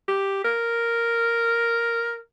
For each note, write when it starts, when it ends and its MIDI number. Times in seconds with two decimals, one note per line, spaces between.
0.08 0.43 67
0.44 2.16 70